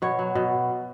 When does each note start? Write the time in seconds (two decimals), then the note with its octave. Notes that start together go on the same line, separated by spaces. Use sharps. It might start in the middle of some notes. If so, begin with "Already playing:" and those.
0.02 B2 C#5
0.19 F#3
0.35 B2